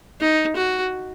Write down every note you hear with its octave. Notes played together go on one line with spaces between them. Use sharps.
D#4
F#4